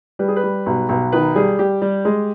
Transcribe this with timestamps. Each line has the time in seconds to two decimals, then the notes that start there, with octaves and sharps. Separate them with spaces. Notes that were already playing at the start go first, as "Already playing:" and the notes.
0.19 G3 B4
0.28 G#4
0.36 B4
0.43 G3
0.66 B1
0.89 B1
1.12 D#3 B4
1.36 G3 G#4
1.59 G3 G4
1.82 G3
2.05 G#3